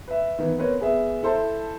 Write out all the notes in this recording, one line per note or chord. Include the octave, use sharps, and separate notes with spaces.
B4 E5
D#3 E3 B3 E4
B3 C4 A#4 B4 C#5
B3 G#4 E5
E4 A4 C5 E5 A5